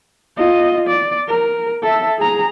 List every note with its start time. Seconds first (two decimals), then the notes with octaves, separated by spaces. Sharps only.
0.37 F4 D#5
0.88 D5
1.28 A#4
1.82 A4 E5
2.19 G#4 A#5